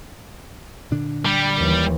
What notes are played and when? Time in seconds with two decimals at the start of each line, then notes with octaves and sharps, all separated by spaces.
0.91 A#2 D3 D4
1.25 G3
1.58 D#2 E3